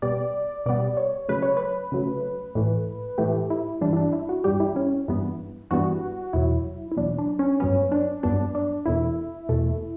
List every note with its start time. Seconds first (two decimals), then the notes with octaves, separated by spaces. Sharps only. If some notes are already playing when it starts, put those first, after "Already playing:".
0.02 B2 G3 B3 D5
0.66 B2 G3 B3 D5
0.97 C#5
1.29 C#3 F#3 A3 B4
1.42 C#5
1.57 B4
1.92 C#3 F#3 A3
2.55 A2 E3 A3
3.18 A2 E3 A3 G4
3.50 E4
3.81 G2 E3 G3 D4
3.93 E4
3.97 D4
4.13 E4
4.29 F#4
4.44 G2 E3 G3 G4
4.60 E4
4.76 C#4
5.08 G2 E3 G3 B3
5.71 G2 E3 G3 B3 F#4
6.33 E2 B2 F#3 E4
6.92 E4
6.96 E2 B2 F#3 D4
7.18 D4
7.39 C#4
7.60 G2 F#3 B3 C#4
7.92 D4
8.23 G2 F#3 B3 D4
8.55 D4
8.86 E2 B2 A3 E4
9.49 E2 B2 A3